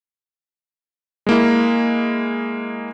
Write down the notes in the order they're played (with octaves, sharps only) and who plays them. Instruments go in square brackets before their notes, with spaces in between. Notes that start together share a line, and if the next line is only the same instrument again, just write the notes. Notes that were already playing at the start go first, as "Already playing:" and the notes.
[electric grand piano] G#3 A#3 E4